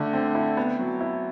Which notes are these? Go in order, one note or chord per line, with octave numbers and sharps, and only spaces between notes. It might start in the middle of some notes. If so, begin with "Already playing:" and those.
Already playing: D3 A3
C4
E4
B3
F#3
E4